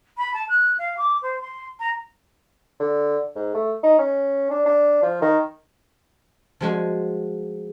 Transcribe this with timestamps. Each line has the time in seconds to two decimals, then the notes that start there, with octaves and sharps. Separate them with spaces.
0.18 B5
0.34 A5
0.49 F#6
0.79 F5
0.98 D6
1.22 C5
1.41 C6
1.80 A#5
2.80 D3
3.35 G#2
3.54 A3
3.83 D#4
3.99 C#4
4.51 D4
4.66 D4
5.03 F3
5.22 D#3
6.61 F3 G#3 F#4